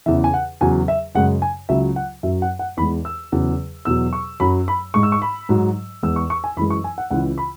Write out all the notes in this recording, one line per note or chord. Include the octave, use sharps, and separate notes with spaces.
E2 C#3 E3 E5
G#5
F#5
E2 C#3 F#3 G#5
E5
F#2 C#3 G#3 F#5
G#5
C#2 C#3 F#3 E5
F#5
F#2 F#3 E5
F#5
F#5
E2 E3 G#3 B5
E6
E2 C#3 F#3
E2 B2 F#3 E6
C#6
F#2 F#3 B5
B5
G#2 G#3 C#6
E6
C#6
B5
G#2 F#3
E2 E3 G#3 E6
C#6
C#6
G#5
F#2 E3 G#3 B5
C#6
G#5
F#5
C#2 C#3 E3 F#5
B5